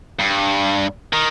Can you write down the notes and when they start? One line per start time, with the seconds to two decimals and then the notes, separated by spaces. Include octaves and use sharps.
0.19 G2
1.13 D#3